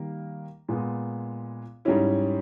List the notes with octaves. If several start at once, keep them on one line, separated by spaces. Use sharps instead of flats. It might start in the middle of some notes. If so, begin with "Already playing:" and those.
Already playing: D#3 G3 A#3
A#2 G#3 B3
G#2 G3 C#4 E4